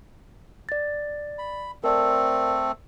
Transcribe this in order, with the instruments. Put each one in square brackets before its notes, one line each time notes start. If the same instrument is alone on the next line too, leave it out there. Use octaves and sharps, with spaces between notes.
[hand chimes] D5 A6
[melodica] B5
[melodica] A3 C4 A4 [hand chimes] A#4 D5 E6